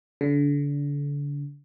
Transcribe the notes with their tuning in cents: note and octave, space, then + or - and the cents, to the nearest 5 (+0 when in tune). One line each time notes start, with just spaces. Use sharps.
D3 -35